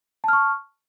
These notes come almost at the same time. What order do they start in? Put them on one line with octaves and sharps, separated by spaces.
A5 F6 C#6